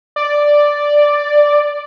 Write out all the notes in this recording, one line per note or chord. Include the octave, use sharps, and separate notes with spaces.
D5